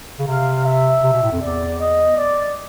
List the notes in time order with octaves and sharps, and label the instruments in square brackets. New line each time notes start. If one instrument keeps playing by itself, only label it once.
[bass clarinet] C#3
[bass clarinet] C3 [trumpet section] F5
[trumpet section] E5
[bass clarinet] C3
B2
A2
F2
[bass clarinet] E2 [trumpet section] D5
[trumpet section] D#5
D5